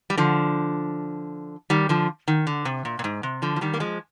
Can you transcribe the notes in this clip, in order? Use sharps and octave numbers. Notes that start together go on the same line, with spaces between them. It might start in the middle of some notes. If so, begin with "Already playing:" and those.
G3
D3 F3
D#3 G3
D3 F3
D#3
D3
C3
A#2
A#2
G#2
C3
D3 F3
F3
D#3 G3
A#3
F3 G#3